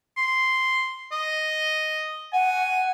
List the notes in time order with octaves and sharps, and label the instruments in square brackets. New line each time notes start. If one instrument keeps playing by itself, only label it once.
[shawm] C6
D#5
[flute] F#5 [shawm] G#5